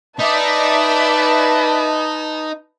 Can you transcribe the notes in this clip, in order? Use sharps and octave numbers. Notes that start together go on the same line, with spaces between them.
D#4 B4 D5 E5 A5